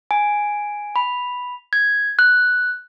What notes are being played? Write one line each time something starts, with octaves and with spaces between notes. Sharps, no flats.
G#5
B5
G#6
F#6